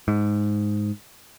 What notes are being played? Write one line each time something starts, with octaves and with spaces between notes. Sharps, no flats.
G#2